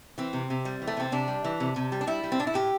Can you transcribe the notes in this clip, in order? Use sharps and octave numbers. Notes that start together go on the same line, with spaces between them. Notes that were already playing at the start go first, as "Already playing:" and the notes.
E3 C4
C3
C3
G3
E3
A3
C3 C4
C3 D4
G3
E3
C3
C3
G3
D4
G3 E4
G3
C4
A2 D4
E4
A2 G4